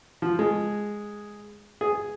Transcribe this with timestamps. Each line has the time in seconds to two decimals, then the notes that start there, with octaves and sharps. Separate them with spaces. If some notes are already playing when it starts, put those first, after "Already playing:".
0.22 F3
0.39 G#3
1.81 G#4